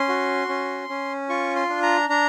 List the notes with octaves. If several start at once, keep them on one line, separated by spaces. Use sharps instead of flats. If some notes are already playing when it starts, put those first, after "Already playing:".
Already playing: C#4 C6
F#4
C#4
C#4
F4 C#6
C6
D4
A#5
D4 A#5